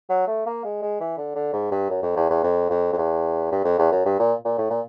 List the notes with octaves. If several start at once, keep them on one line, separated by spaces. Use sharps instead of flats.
F#3
A3
A#3
G#3
G#3
E3
D3
D3
G#2
G2
F#2
F2
E2
E2
F2
F2
F2
E2
G2
F2
E2
F#2
G2
A#2
A#2
A2
A#2